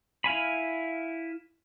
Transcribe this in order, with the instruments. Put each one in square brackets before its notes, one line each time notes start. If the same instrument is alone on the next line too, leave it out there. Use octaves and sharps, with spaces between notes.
[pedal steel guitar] E4 F5 G#5 B5